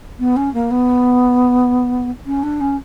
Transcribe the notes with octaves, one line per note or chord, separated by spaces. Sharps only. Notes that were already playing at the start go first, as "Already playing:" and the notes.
B3
C#4
A#3
B3
C#4
D4
C#4